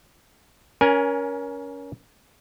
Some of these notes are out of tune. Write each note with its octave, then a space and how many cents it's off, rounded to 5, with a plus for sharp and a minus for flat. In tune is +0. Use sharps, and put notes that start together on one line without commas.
C#4 +20 A#4 +25 G#5 +0